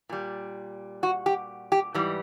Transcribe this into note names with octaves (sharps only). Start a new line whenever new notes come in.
A#2 G3
F#4
G4
G4
G#2 E3 G3